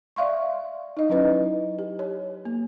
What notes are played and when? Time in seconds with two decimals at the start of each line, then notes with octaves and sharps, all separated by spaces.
0.16 D5 E5 F5 C6 C#6
0.97 D#4 D#5
1.09 F#3 C#4 E4 B4 D#5
1.79 G4
1.99 C#5
2.45 A#3